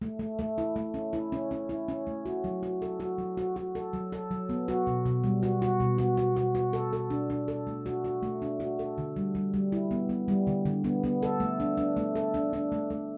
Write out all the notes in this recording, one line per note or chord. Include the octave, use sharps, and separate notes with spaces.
A3
A3
A3
E4
A3
C#4
E4
C#4
C#4
E4
C#4
A3
F#4
F#3
F#4
A4
F#4
F#3
F#4
F#4
A4
F#3
A4
F#3
B3
F#4
B2
B2
G3
F#4
F#4
B2
F#4
F#4
F#4
F#4
A4
A4
D4
D4
A4
A3
F#4
F#4
A3
D4
F#4
A4
D3
G3
G3
G3
E4
B3
B3
G3
D3
D3
B3
B3
A4
A3
D4
D4
A3
A4
D4
D4
A3
A3